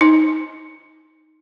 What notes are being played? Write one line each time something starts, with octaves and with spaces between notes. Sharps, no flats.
D#4